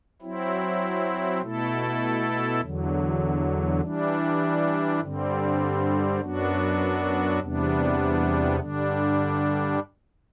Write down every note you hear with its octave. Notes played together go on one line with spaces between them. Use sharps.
F#3 C4 E4
B2 A3 E4 A4
E2 D3 F#3
E3 G3 D4
G2 D3 G3 C4
F#2 F#3 B3 D4 F#4
E2 C3 G3 B3 D4
G2 D3 G3 D4